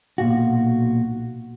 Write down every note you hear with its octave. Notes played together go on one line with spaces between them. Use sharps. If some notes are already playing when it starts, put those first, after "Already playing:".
B1 A#2 F#4